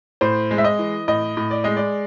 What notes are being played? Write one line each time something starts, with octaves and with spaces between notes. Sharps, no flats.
A2 C5
G#3
E5
D#5
E3
A2 D#5
A2
D5
G#3 D#5
D5